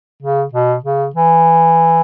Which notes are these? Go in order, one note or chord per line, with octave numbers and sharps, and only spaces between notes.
C#3
B2
C#3
E3